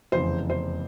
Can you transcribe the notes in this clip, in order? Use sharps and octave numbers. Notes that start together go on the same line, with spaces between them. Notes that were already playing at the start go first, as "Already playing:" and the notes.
F1 E2 C#3 E3 C5
C5